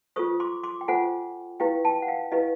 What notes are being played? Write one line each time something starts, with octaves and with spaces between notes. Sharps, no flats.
F4 A4 C5 C#6 D#6
C6 D6
C6 D6
G5
F4 A4 C5 F#5 G#5
E4 G4 B4 F5 G5
G5 A5
F#5
F5 G5
E4 G4 B4 D#5 F5